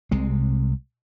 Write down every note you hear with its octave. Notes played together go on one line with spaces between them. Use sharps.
C2 C3 G#3